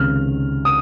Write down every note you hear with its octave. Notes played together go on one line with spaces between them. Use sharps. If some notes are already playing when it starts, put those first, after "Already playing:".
Already playing: C#2 C3 D#3 F6
D#6